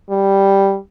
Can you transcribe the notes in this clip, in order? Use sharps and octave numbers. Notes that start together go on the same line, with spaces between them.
G3